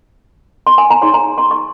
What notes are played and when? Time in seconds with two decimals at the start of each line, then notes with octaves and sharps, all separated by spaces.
0.67 C6
0.78 G#5
0.90 A#5
1.02 D#4 G#4 C#5 C6
1.14 A#5
1.38 C6
1.51 C#6